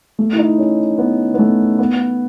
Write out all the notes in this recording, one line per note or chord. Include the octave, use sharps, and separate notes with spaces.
A3
E4
D#4
C#4
B3
B3
A3
B3